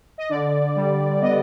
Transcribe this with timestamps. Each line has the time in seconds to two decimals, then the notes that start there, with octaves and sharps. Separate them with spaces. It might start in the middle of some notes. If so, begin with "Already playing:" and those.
0.18 D#5
0.29 D3 D5
0.76 G3
1.21 B3 D#5